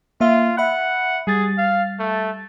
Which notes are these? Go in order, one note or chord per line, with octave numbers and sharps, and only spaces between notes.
A#3 F4 E5
E5 F#5 B5 F#6
G3 G#4 A6
F5
A3